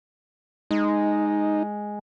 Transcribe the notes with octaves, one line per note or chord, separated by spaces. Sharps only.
G#3 D#4